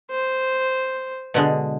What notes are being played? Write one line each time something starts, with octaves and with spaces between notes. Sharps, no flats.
C5
B2 D3 G#3